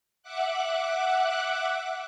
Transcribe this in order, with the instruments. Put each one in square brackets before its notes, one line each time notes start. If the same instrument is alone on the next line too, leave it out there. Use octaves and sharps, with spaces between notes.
[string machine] E5 F#5 D6 F#6